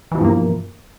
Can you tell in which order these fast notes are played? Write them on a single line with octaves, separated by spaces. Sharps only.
E3 B2 F3 G2 A#3